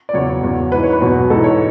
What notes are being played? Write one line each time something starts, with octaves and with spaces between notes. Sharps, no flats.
D5
E2 C#3 F#3 C#5
E2 C#3 F#3
G#2 E3 B4
C#5
B4
E2 B2 F#3
G#2 E3 A4
C#5